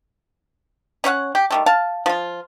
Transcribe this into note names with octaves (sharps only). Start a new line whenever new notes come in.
C#4 C#5 F5 F#5
G4
D#3 G3 A3
F5 A5
F3 F4